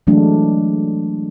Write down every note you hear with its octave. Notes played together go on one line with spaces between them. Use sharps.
E3 F#3 G#3 A3 D4